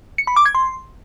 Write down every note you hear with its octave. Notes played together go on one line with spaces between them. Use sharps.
C#7
B5
D6
G#6
C6